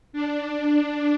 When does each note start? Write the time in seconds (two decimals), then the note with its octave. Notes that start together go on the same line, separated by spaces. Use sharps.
0.13 D4